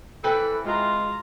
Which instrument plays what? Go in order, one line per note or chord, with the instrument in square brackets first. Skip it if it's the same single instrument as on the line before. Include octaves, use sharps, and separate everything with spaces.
[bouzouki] E3 C4 B4 [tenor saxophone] A4
[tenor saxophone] G#3 [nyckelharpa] F4 A#5